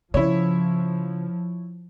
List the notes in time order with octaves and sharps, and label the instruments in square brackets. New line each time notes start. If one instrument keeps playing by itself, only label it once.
[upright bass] C#3 [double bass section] F3 [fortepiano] E4 C#5